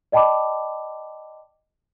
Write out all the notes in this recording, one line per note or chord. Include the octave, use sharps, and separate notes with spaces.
D5 D#5 G5 A5 B5 D6